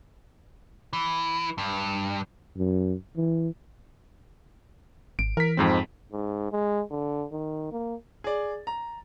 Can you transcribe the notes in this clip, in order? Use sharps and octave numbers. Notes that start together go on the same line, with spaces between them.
E3
G2
F#2
E3
G#1 D7
E3 A#4 B6
F2 G#2 C4
G#2
G#3
D3
D#3
A#3
G#4 D5
A#5